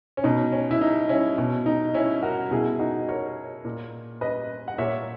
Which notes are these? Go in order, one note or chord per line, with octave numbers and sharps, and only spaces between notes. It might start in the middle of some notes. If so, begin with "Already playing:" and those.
C#4
B2 D#4
C#4
E4
D#4
C#4 E4
B2
D#4
C#4 E4
F#4 A#4
B2 E4 G#4
D#4 F#4
A#4 C#5
A#2
B4 D#5
F#5
A#2 C#5 E5